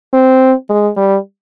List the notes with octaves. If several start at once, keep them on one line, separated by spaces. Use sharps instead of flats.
C4
G#3
G3